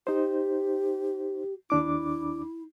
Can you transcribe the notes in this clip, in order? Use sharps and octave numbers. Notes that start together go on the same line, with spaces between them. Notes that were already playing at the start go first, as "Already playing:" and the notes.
D#4 G4 C5
D#2 D4 E4 D6